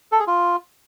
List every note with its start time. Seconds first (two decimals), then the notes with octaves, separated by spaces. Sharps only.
0.12 A4
0.20 G#4
0.27 F4